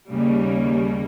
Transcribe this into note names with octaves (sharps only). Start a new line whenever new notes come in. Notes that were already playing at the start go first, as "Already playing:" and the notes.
D#2 C#3 G3 A#3